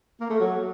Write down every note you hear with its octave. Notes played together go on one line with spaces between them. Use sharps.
A#3
A3
F#3